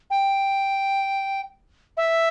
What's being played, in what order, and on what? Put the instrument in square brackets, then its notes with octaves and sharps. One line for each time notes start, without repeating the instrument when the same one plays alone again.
[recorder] G5
E5